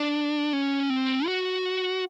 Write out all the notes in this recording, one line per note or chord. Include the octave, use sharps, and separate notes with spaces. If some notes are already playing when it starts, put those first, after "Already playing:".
Already playing: D4
C#4
C4
F#4